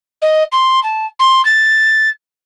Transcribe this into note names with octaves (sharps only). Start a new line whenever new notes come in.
D#5
C6
A5
C6
A6